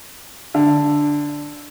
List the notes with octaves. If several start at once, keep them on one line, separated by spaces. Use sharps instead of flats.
D3